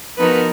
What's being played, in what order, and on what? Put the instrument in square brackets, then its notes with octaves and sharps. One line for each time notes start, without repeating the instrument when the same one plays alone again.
[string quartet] F3 B3 D#4 F#4 A#4 [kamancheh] B4